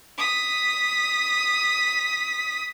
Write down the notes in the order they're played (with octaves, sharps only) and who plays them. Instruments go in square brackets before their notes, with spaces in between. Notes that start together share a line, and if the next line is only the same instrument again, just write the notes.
[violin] D#6 B6